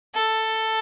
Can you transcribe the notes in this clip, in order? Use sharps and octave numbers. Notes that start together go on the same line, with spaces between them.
A4